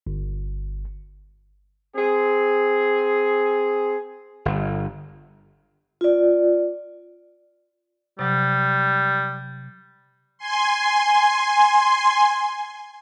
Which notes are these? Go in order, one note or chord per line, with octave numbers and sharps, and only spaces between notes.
G1
C4 G#4
G1
F4 D5
C3 F#3 G3
G#5 C6